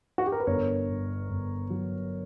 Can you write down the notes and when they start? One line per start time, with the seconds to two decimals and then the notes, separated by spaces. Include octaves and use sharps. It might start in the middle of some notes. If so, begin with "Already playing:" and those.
0.18 F#4
0.26 G4
0.32 A#4
0.40 B4
0.47 G1 A#4 C#5
0.89 G2
1.30 G1
1.70 F#3